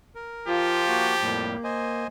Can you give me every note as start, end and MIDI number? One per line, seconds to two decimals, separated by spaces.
0.15 0.85 70
0.48 1.47 53
0.48 1.06 65
0.48 1.61 67
0.88 1.14 58
0.88 1.14 66
1.22 1.57 41
1.22 1.57 45
1.22 1.57 55
1.22 2.04 58
1.64 2.07 72
1.64 2.07 75
1.64 2.07 80